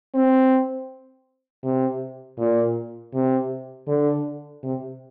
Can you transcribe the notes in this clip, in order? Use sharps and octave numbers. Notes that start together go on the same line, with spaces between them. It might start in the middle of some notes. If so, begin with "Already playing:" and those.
C4
C3
A#2
C3
D3
C3